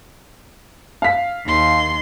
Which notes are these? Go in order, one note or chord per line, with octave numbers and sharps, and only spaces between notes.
F5 B6
D#2 C6